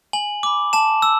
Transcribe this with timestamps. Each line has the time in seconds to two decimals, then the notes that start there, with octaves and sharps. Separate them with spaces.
0.13 G#5 F#7
0.43 B5 D6
0.73 A5 E7
1.02 E6